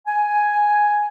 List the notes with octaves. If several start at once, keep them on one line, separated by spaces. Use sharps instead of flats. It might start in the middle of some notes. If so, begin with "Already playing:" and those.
G#5